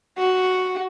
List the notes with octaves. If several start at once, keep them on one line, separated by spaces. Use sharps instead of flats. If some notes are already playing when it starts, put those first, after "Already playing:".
F#4